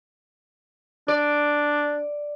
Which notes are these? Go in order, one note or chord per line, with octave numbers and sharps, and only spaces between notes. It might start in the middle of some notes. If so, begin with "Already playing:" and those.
D4 D5